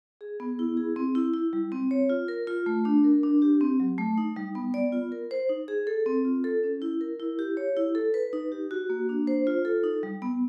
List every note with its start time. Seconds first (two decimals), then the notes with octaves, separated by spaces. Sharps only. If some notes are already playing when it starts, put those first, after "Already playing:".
0.21 G#4
0.40 B3
0.59 E4
0.77 G#4
0.96 C4
1.15 E4
1.33 E4
1.53 G3
1.72 C4
1.91 C#5
2.10 F4
2.28 A#4
2.47 F4
2.66 A3
2.85 D4
3.04 A#4
3.23 D4
3.42 G4
3.61 C4
3.80 F#3
3.98 A3
4.18 D#4
4.36 G3
4.55 B3
4.74 D5
4.92 F4
5.12 A#4
5.31 C5
5.49 D#4
5.68 G#4
5.87 A4
6.06 C4
6.25 F4
6.44 A4
6.63 C#4
6.82 E4
7.01 A#4
7.20 E4
7.39 G4
7.57 C#5
7.77 E4
7.95 A4
8.14 B4
8.33 D#4
8.52 G4
8.71 F#4
8.90 A#3
9.09 D4
9.27 C5
9.47 F4
9.65 A4
9.84 D#4
10.03 G3
10.22 B3